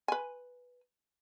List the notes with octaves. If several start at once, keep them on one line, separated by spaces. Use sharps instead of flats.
B4 G#5